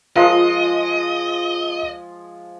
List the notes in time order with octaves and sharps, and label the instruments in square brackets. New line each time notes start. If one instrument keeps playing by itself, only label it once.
[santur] F3 G#3 D#6 [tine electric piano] F4 [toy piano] A#4 F5 A#5 [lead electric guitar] D#5